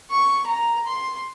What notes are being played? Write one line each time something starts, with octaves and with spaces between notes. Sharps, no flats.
C#6
A#5
C6